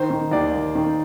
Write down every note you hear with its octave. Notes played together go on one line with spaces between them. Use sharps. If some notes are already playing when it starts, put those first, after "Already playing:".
Already playing: D#3 C5
D#3
D#2 D5
D#2
D#3